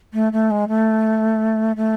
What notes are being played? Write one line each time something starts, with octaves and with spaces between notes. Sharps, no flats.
A3
A3
G#3
A3
A3